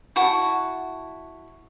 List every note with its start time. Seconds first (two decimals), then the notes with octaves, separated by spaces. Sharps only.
0.16 E4 F#4 A5